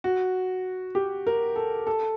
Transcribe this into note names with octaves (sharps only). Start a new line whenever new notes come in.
F#4
G4
A#4
A4
A4